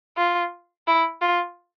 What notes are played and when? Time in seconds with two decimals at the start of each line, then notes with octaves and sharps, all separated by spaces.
0.17 F4
0.87 E4
1.22 F4